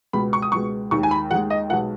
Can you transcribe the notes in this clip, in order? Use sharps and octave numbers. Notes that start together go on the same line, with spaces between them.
C#2 B2 G#3 B5
C#6
D#6
C#2 B2 G#3 C#6
D#2 D#3 G#3 C#6
G#5
B5
D#2 D#3 G#3 F#5
D#5
B1 B2 G#3 F#5